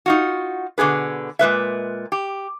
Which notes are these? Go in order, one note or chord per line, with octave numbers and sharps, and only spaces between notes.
D#4 F4 F#4
B2 D3 F3 G#4 B4
A#2 G#3 B4 E5
G4